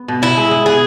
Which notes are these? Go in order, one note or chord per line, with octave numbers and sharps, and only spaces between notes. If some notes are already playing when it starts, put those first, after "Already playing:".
Already playing: B3
B2
B2 E4
G#3
G#3
B3 G#4